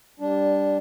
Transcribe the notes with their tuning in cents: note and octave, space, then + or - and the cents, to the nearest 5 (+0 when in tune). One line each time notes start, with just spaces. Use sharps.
G3 +0 D4 -10